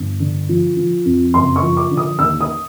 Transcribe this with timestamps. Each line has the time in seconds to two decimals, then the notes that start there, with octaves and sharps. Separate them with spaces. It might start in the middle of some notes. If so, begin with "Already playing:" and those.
Already playing: G1
0.20 D3
0.49 F3
0.76 F3
1.05 F2
1.34 F#1 C6
1.56 C#6
1.62 F3
1.77 D6
1.91 D3
1.97 D#6
2.19 D#2 E6
2.41 D#6